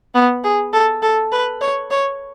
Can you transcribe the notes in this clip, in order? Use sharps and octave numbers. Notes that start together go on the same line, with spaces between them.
B3
G#4
A4
A4
B4
C#5
C#5